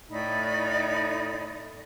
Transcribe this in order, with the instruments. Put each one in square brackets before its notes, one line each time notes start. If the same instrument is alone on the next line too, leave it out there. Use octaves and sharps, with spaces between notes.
[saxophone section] A2 [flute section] D#4 D5 B5